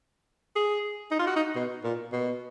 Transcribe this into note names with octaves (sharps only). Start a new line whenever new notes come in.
G#4
D#4
F4
F#4
D#4
B2
A#2
B2